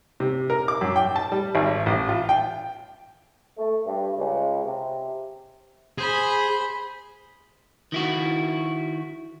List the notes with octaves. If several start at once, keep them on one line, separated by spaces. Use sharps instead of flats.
C3
A#4
D6
F#2
G5
A5
G3
G#1
A1
F4
G5
A3
G2
C#2
C3
G#4 C5 B5
D#3 E4 F#4